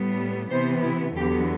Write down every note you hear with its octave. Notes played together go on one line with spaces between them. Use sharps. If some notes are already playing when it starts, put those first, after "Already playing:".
Already playing: A2 G3 B3
C3 E3 B3 C5
E4
E2 D3 F#3 B3 G4